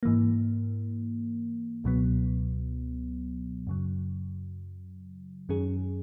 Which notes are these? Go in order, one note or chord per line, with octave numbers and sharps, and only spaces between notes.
G#2 E3 A#3
C#2 B2 F#3 B3
F#2 C#3 F#3
F#2 D#3 F#3 C#4 G#4